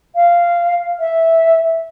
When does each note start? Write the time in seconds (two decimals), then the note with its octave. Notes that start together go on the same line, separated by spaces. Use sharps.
0.15 F5
1.00 E5